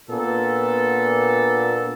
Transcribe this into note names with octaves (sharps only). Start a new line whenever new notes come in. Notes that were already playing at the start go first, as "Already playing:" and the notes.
A#2 B3 D4 A4